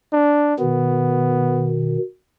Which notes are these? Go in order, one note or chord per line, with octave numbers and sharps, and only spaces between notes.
D4
B2 D#3 B3